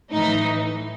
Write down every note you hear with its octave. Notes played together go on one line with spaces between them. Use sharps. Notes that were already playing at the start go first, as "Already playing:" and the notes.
A2 E3 D#4